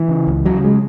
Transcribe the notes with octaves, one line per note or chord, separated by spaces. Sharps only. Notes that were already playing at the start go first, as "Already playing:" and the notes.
Already playing: E3
C#3
C#2
C#3 F#3
G#3